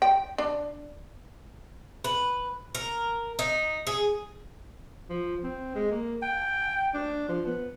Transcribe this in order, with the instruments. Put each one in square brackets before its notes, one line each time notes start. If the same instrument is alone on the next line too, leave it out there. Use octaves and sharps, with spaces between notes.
[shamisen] G5
D4
[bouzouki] B4
A#4
D#4
G#4
[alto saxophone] F3
C4
G#3
A#3
G5
D4
F3
B3